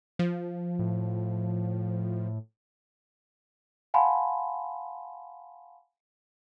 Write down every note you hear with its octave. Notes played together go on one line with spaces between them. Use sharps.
F3
A2
F5 F#5 G#5 A5 B5 C6